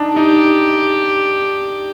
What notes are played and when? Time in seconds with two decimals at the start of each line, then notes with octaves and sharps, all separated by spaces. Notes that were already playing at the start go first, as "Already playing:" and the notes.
Already playing: D4 D#4
0.16 D#4 G4